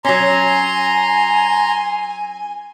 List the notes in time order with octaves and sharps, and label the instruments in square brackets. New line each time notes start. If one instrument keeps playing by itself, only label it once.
[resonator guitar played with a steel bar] F#3 C#4 [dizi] G#5 [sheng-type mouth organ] A#5 C6